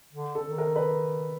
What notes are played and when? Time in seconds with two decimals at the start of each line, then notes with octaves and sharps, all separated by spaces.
0.13 D3
0.35 A4
0.47 D#3
0.58 A#4
0.76 B4